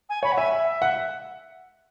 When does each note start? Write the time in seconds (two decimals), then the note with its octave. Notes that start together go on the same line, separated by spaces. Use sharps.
0.09 G#5
0.23 C#5 B5
0.32 F#5
0.38 E5 G#5
0.53 E5
0.82 F#5